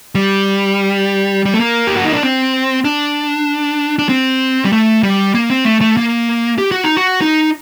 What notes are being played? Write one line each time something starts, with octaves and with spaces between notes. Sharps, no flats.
G3
G3
A3
A#3
G4
F#4
D#4
D4
C4
D4
D4
C4
G3
A3
G3
A#3
C4
A3
A3
A#3
G4
F#4
D#4
F#4
D#4